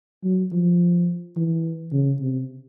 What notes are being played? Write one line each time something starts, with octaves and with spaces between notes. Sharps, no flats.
F#3
F3
E3
C#3
C3